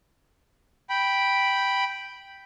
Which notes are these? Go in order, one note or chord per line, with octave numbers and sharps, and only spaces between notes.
G5 B5